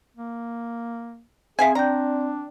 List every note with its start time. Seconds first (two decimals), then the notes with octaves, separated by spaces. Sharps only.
0.17 A#3
1.59 C4 G#4 E5 F5 G#5
1.75 D4 D5 G5 A#5 G6